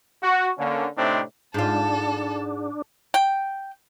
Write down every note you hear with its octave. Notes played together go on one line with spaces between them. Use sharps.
F#4
D3 A#3 C#4
A2 C3 A3 C4 D4 D#4
G#2 D4 F4 A4 A5
G5